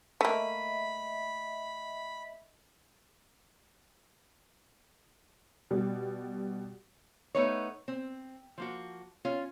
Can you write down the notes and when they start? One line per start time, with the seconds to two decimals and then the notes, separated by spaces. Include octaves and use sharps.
0.21 A3 A#3 D#5 E5 B5
5.71 B2 G3
7.35 A3 B3 D#4 B4 C#5
7.88 C4
8.58 F3 A#3 F#4
9.25 C#4 F4